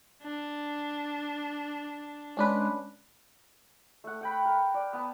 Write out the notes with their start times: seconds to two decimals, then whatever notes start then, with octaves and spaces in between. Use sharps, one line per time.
0.23 D4
2.37 G#3 C#4 D4 B4
4.04 A3 F#5
4.21 F#5 G5 B5
4.45 A#4
4.74 D5
4.93 B3 A5